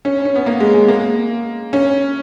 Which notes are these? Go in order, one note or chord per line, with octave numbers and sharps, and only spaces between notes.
C#4
C#4
B3
A#3
G#3
G#3
A#3
C#4